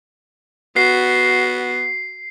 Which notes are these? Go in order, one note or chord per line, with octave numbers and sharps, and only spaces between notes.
B3 F#4 C7